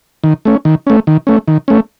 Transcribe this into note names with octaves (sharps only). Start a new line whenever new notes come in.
D#3
A3 C#4
D#3
A3 C#4
D#3
A3 C#4
D#3
A3 C#4